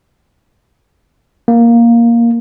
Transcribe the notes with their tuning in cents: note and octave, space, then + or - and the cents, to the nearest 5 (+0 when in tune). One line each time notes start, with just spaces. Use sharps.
A#3 +5